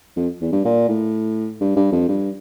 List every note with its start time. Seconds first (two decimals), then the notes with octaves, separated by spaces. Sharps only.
0.17 F2
0.41 E2
0.52 G2
0.65 A#2
0.89 A2
1.61 G2
1.76 G2
1.92 F2
2.08 G2